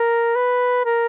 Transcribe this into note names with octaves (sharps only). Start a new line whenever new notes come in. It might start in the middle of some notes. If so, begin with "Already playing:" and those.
Already playing: A#4
B4
A#4